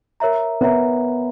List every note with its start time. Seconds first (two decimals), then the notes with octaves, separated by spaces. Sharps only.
0.20 A#4 C#5 E5 A#5
0.61 B3 A#4 C#5 E5 A#5